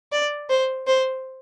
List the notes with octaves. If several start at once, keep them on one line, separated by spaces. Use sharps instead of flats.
D5
C5
C5